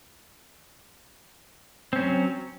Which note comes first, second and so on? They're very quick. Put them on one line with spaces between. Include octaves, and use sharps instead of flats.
C4 C#4 F#3